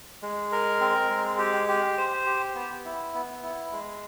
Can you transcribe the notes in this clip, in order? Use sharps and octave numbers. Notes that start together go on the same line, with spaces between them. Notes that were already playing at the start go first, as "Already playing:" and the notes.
G#3
A#4
C4
G#3
G4
G4
C5
G4
B3
E4
B3
E4
G#3